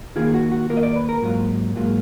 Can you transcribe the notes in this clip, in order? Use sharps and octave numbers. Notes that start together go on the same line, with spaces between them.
D#3 A#3 F4 G#4
F#4
F#4
D#3 A#3 F4 A#4
D#5
D5
B4
A#4
G#2 F#3 A#3 F4
G#2 F#3 A#3 F4